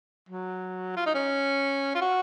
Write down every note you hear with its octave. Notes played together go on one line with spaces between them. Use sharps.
F#3
F4
D#4
C#4
F4
F#4